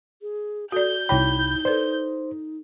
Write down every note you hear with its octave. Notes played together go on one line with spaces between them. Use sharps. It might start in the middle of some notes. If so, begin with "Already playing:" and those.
G#4
F#4 A4 D5 G6
C2 D#4 E4 C#5 G5 B5
A4 B4 C5 D5